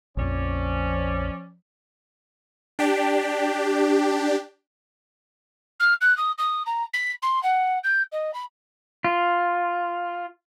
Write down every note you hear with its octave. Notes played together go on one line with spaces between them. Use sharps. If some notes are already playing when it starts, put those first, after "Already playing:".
A#1 F2 F3 C#4 D5
D4 G4
F6
F#6
D#6
D#6
A#5
B6
C6
F#5
G6
D#5
B5
F4